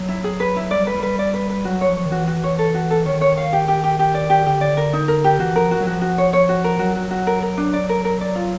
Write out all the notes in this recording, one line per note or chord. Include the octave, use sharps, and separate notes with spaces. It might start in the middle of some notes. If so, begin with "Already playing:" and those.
Already playing: F#3
E4
G#4
B4
E4
G3 D5
B4
G3
B4
D5
B4
B4
F#3 F#4
C#5
F3
C#5
D#3
E3 F#4
F#4
C#5
A4
F#4
A4
D#3 C#5
C#5
F5
G4
G4
G4
G4
D5
G4
D3 G4
D5
A#4
D#4
A#4
G4
E3 F#4
F3 A#4
F#4
F#3
F3 F#4
F#4
C#5
C#5
F#4
A#4
F#3 F#4
F#4
F#4
A#4
A#4
D4
D5
A#4
A#4
D5
F4